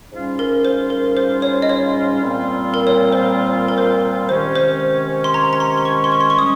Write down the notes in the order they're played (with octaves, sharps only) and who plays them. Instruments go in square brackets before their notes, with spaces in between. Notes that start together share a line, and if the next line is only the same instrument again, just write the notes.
[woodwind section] G#2 G3 C#4 F4
[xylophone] A#4
C5
A#4
C5
C#5
D#5
C#5
[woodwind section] A#2 G3 C4 F4
[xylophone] A#4
C#5
C5
A#4
C5
[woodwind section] C3 D#3 G#3 C#4 [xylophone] C5
[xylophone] C5
C6
A#5
A#5
C6
C6
C#6
C6
C#6
C6
C#6
[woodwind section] G3 C#4 [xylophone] D#6